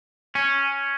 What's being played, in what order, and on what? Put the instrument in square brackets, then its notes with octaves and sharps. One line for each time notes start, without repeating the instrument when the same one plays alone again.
[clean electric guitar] C#4